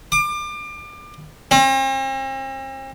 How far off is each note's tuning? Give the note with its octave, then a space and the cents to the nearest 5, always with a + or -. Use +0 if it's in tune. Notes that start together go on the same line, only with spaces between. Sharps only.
D6 +30
C4 +45